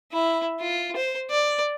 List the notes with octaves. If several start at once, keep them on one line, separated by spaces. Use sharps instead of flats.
E4
F4
C5
D5